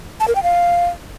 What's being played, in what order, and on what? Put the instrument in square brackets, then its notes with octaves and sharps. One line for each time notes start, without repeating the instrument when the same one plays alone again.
[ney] A5
A#4
G5
F5